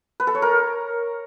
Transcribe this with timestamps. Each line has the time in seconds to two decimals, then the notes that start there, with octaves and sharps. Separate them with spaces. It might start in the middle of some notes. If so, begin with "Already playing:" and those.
0.20 B4
0.27 A4
0.35 C#5
0.42 A#4